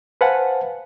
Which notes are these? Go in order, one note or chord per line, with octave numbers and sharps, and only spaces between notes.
B4 C5 F5 F#5 G#5 A5